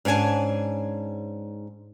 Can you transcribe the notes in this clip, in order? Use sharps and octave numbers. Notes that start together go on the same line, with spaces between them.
G#2 C#4 D4 G#5 A5